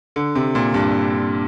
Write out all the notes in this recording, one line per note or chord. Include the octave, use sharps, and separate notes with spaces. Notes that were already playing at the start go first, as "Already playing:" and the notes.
D3
C3
A#2
G2